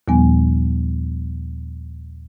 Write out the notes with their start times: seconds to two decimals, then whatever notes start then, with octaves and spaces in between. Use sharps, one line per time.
0.08 D#2 A#2 F3 G3 B3 G#5